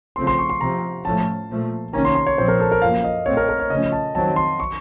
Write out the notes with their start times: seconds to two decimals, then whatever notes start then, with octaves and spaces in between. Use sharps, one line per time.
0.16 C#3 F3 A3 C4 C6
0.27 C6
0.39 C#6
0.49 C6
0.61 C3 F3 C4 A#5
1.05 A2 F3 A3 C#4 A5
1.50 A#2 F3 A3
1.93 C3 D#3 A#3 C#4 A#5
2.05 C6
2.15 C6
2.27 C#5
2.37 A#2 F3 C4 C5
2.48 A#4
2.60 A4
2.72 A#4
2.81 F#2 F3 A#3 F5
3.04 D#5
3.26 A#2 A3 C4 C#5
3.37 A#4
3.49 A#4
3.60 C#5
3.70 C#3 F3 A3 C#4 D#5
3.92 A5
4.14 F2 D#3 F#3 C4 A5
4.36 C6
4.60 C#6